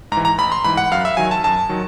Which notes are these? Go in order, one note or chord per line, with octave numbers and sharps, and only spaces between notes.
G#2 A#5
E3
A#5
A1 B5
C6
G#2 E3 B5
F#5
F#2 F5
E5
D#3 F#3 G#5
A5
F#2 A5
D#3 F#3